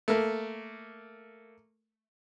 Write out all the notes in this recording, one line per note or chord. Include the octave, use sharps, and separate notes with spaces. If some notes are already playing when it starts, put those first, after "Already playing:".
A3 A#3